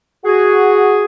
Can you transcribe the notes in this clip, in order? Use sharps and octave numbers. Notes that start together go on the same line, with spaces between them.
F#4 G#4